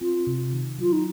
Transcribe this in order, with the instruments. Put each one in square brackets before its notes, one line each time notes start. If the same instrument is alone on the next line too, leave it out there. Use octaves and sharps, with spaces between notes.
[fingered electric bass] C4 [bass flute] F4
[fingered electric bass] C3
D#3
[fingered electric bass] F#3 [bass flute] F4
[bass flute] D#4